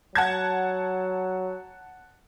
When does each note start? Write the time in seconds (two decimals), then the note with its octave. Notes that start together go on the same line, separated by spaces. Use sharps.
0.15 F#3 F#5 A5 G#6